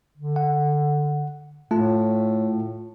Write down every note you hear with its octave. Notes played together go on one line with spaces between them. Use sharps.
D3
F#5
A2 A3 F4 A5